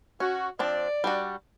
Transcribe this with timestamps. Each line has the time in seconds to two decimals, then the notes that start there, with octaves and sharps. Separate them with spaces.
0.20 C#4 F#4
0.59 F3 C4 D4 D5
1.04 G3 D4 F#4